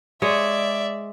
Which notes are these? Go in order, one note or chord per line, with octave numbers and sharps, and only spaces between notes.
G#3 C#5 D5 E5